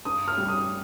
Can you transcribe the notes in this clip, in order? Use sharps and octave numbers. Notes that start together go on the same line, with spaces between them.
G2 D#6
F6
G3
D#6